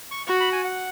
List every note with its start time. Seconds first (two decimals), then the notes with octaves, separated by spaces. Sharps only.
0.11 C#6
0.27 F#4 C#6
0.40 B5
0.53 G#5
0.65 F#5